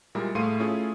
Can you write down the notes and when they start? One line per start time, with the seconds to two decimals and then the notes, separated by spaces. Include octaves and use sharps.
0.15 A#2 G3 G#3 E4 A#4
0.35 A2 A3 G#4 F5 C6 D#7
0.60 A3 C#4 E4 F4 G#4